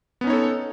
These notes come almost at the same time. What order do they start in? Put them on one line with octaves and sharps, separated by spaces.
B3 C#4 D#4 C#5 A4